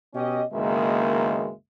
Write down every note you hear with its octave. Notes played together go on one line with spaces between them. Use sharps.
B2 C#4 G4 D#5
F#1 B1 D#3 G#3 A#3 E5